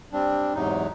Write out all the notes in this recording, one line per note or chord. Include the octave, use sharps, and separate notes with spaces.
G3 C4 D4
E2 G#2 C3 F#3 D#4